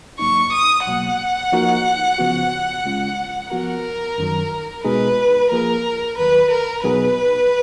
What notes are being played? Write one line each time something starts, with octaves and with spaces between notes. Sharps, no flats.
G#2 F#3 A#3 D#4 C#6
D#6
C#2 B2 F#3 A#3 F#5
F3 A#3 D#4 F#4 A#4
C#3 F3 B3 F#4
C#3 G#3 C#4 F4
F3 B3 F#4 A#4
F#2 D#3 F#3
B2 G#3 D#4 G#4 B4
F3 A#3 F4 G#4 A#4
D#2 D#3 F#3 B4
A#4
B2 F#3 B3 D#4 G#4 B4